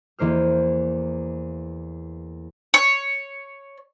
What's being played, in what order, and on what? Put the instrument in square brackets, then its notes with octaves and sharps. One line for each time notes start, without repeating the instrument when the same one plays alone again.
[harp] E2 E3 A#3 C5 F6
[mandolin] C#5